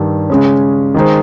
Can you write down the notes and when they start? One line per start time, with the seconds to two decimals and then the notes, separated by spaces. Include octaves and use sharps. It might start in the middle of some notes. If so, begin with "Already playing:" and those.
Already playing: G2 D#3 G3
0.30 C#3 G#3 C#4
0.94 D#3 G#3 D#4 G#4 C5